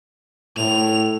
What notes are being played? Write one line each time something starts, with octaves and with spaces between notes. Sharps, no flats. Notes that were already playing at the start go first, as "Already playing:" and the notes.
A2 F7